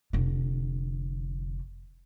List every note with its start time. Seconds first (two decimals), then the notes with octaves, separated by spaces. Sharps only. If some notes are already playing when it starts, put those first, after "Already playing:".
0.13 F1 D3